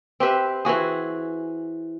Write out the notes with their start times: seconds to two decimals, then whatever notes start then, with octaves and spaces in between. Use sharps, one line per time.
0.20 C4 G4 B4 E5
0.65 E3 C4 F#4 G#4